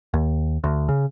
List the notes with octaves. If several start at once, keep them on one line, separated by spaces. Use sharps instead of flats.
D#2
D2
C#3